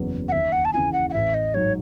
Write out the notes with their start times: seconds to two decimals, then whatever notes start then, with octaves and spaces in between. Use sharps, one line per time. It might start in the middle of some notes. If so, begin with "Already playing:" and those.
Already playing: F#1 E2 C#3 F#3 B3
0.28 F#5
0.32 D#2 E5
0.52 F#5
0.65 A5
0.73 C#3 E3 G#5
0.93 F#5
1.10 F#5
1.13 A1 E5
1.34 D#5
1.54 G#2 F#3 C#5